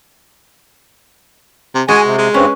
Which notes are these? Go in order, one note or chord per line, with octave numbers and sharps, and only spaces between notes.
C3
G#3 F#4 D#5 G#5
C3
G#3
G2 C4 C#4 B4